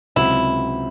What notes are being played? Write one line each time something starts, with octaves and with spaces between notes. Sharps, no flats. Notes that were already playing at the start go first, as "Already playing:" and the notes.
C#2 C3 F#3 C4 E4 F#4